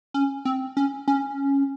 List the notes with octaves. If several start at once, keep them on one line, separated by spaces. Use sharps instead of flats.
C#4
C4
C#4
C#4